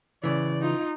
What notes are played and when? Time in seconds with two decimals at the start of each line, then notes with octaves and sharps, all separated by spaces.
0.24 C#3 E3 D5
0.62 D#4 F4